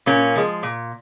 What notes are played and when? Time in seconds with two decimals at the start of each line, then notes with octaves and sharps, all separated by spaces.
0.06 A#2 A#3 C#4
0.35 F3 G#3
0.63 A#2